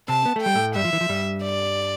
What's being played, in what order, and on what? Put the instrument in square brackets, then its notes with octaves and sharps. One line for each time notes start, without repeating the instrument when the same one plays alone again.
[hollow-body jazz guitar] C3 C4 [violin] A5
[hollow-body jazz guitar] B3
A3
[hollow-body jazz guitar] G3 [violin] G5
[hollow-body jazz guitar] A2 A3
[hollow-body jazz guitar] G2 G3 [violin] E5
[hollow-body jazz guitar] F3
E3
F3
G2 G3
[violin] D5